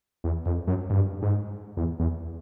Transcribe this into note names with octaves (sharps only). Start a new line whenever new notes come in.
E2
F2
F#2
G2
G#2
E2
E2